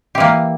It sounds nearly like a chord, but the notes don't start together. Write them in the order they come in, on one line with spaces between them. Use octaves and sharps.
G4 E3 A#3